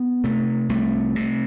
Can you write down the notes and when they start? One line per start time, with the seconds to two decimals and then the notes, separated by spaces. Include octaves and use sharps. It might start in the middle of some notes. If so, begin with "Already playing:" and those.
Already playing: B3
0.24 C3 A3
0.69 C2 A3
1.16 C3